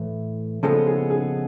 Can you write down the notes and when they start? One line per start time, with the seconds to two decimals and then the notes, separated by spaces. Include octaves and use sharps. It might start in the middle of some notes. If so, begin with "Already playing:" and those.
Already playing: A2 E3 A3
0.63 C#3 F3 G#3 B3 A4
0.87 G#4
1.10 G#4